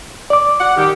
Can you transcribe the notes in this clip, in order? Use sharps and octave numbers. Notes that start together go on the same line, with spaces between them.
D5 D6
F#5
D#3 G4